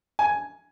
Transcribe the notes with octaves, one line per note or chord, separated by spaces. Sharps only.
G#5